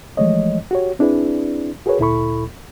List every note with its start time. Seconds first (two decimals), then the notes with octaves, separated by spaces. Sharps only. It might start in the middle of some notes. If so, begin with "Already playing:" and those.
0.17 E3 F3 G#3 A3 C#5 D#5
0.71 F#4 G4 C#5
0.99 C4 D4 E4 G#4 B4 D5
1.86 F#4 G#4 A#4 B4 C#5
1.99 D2 A#2 E4 A4 B5 C#6